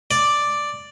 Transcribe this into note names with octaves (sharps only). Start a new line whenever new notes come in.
D5